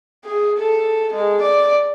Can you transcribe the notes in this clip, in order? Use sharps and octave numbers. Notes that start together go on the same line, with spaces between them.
G#4
A4
G#3
D5